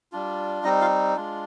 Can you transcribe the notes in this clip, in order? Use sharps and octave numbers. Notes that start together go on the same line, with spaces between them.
G3 D4 F4
G3 C4 D#4 D#5
F4 F5
G#3 D4 F4